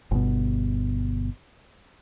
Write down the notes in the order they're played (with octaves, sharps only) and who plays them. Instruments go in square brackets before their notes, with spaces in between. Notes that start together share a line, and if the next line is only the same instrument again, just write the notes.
[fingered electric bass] G1 B2